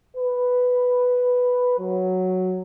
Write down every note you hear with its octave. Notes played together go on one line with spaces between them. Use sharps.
B4
F#3